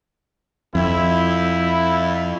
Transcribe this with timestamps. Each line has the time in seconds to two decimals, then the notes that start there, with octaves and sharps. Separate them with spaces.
0.75 F2 E4